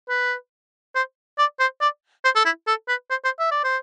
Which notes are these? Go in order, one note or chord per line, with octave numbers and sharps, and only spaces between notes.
B4
C5
D5
C5
D5
C5
A4
E4
A4
B4
C5
C5
E5
D5
C5